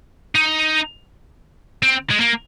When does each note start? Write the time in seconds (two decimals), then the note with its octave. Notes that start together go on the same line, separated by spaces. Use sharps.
0.35 D#4
1.83 C4
2.11 G#3
2.20 A#3